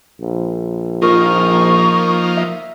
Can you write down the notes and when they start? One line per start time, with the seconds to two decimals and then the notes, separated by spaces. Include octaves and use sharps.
0.21 A#1
1.02 F3 A#3 D#4 F4 A#4 C#6 F6
2.37 E5